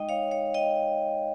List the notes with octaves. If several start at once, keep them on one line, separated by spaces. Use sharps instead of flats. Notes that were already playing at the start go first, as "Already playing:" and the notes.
Already playing: G#3 D#4 D#5 G5
C#5 F5
C#5 F5
D#5 G5